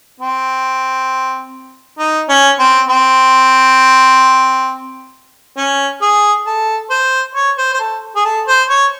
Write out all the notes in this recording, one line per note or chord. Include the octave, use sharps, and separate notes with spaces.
C4
D#4
C#4
C4
C4
C#4
G#4
A4
C5
C#5
C5
C5
A4
G#4
A4
C5
C#5